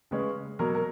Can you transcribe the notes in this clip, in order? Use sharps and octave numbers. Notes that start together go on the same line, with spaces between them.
C#3 G#3 C#4 B4
B2 F#3 A#3 A#4
A#4